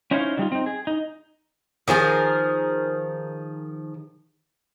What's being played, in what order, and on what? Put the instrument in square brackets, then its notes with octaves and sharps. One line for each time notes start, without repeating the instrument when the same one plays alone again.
[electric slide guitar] C#4 D#4 E4 C5 C#5 F5
D3 G3 D#4 F4
C4 D#4
G#4
D#4
[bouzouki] D#3 F3 G#4 A#4